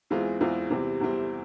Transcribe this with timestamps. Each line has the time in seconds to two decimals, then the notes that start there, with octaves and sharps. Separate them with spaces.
0.10 E2 E3 G#3 C4 F4
0.41 E2 E3 G#3 C4 F4
0.70 E2 C3 E3 G3 C4
1.00 E2 C3 E3 G3 C4